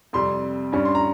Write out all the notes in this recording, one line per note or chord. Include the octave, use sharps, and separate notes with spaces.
F2 C3 G3 C6
G2 G3 C#4
C6
A#5